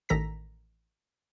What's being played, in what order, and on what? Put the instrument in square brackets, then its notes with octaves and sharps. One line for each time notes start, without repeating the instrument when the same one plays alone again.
[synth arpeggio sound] A1 D#3 A4 A#5 A#6 B6